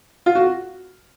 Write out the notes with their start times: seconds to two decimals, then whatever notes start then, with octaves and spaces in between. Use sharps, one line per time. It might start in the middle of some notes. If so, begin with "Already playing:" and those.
0.26 F4
0.35 F#4